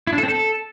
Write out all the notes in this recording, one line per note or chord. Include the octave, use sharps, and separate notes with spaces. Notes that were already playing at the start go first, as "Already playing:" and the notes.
E4
D4
A4
C4
A4